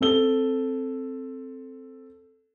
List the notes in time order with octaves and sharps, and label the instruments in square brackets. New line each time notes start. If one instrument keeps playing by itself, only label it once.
[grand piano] C4 A4 G7